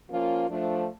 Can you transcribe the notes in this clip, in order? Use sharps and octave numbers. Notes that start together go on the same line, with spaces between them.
F3 A#3 C#4 F4
F3 A3 D4